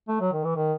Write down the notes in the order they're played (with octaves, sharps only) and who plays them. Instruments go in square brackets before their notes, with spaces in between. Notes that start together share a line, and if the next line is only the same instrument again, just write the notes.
[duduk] A3
F#3
D#3
E3
D#3